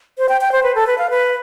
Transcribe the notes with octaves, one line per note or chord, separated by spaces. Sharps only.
C5
G5
G5
C5
B4
A4
B4
F5
B4